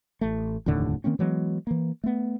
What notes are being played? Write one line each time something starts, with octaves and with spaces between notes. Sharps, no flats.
A1 A3
F1 D#2 A2 D3
D#3 A#3 C4 C#4
E3 F#3 G#3 B3
E3 A#3
A3 B3